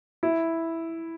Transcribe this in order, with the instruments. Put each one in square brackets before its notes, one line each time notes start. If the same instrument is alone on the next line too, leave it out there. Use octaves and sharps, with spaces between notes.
[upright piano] E4